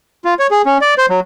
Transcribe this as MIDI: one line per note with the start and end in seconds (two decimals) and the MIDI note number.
0.25 0.34 65
0.39 0.47 73
0.51 0.62 68
0.66 0.78 61
0.81 0.94 74
0.98 1.06 72
1.10 1.20 54